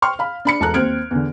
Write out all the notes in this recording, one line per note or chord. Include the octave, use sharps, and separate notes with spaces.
G5 C6 C#6 F6
F5 B5
D4 B5 C#7
E1 A4 A5 A#5 F#6
D#2 C4 F6 G#6 D7
E2 D3